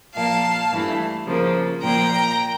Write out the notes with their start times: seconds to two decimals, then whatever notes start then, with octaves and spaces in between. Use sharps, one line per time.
0.15 A#2 F3 A#3 F5 A5
0.71 G2 E3 A3
1.27 C#3 F3 A#3
1.83 A#2 F3 A#3 G5 A#5